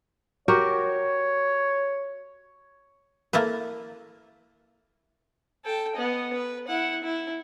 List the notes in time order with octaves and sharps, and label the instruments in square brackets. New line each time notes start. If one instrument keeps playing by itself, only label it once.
[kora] F#4 G4 A#4 [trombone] C#5
[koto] A#3 E4 A4 B4
[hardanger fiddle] A4 G5
B3 D#5
B4
E4 F#5
E4